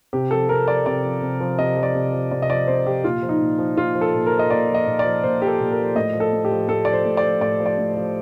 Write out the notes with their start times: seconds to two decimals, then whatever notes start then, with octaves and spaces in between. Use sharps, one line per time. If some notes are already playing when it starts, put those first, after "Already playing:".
0.13 C3 G4
0.31 F3 A4
0.49 C3 A#4
0.68 F3 D5
0.86 C3 D5
1.04 F3
1.22 C3
1.41 F3
1.59 C3 D#5
1.77 F3
1.83 D5
1.95 C3
2.13 F3
2.31 C3 D5
2.42 D#5
2.50 F3 D5
2.67 C3 C5
2.86 F3 G4
3.04 A#2 F4
3.23 F3
3.29 D#4
3.41 A#2
3.59 F3
3.77 A#2 F4
3.95 F3
4.01 A4
4.14 A#2
4.26 A#4
4.32 F3
4.39 D#5
4.50 A#2 D5
4.69 F3
4.74 D#5
4.87 A#2
4.99 D5
5.05 F3
5.23 A#2 C5
5.41 F3 G4
5.47 A4
5.60 A#2
5.71 A#4
5.78 F3
5.95 A2 D#5
6.13 F3
6.20 A4
6.32 A2
6.45 G4
6.51 F3
6.68 A2 A4
6.85 F3 D5
6.93 C5
7.05 A2
7.17 D5
7.23 F3
7.41 A2 D5
7.60 F3
7.66 D5
7.78 A2
7.96 F3